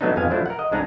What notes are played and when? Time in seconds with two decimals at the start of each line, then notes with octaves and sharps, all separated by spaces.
0.01 F#3 A3 B3 D4 D#4
0.16 F2 G#2 G#3 B3 F5 G#5
0.30 F3 F#3 A3 D4 E4
0.46 A#4 F#5
0.59 D#5
0.71 C2 G#3 D4 D#4 F#5 A#5